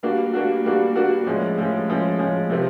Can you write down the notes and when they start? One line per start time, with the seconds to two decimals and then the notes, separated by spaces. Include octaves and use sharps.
0.03 G3 A#3 D4 F#4
0.33 G3 A#3 D4 F#4
0.65 G3 A#3 D4 F#4
0.96 G3 A#3 D4 F#4
1.26 A2 F3 G#3 C#4
1.57 A2 F3 G#3 C#4
1.88 A2 F3 G#3 C#4
2.19 A2 F3 G#3 C#4
2.50 C3 F3 A3 C4